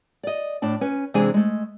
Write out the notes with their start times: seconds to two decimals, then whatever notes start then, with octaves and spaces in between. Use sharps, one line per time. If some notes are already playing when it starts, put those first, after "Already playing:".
0.23 D5 D#5
0.62 A2 D4 A5
0.81 C#4 B4
1.14 C3 E3 G#3 D4 G#4 G#5
1.34 G#3 A3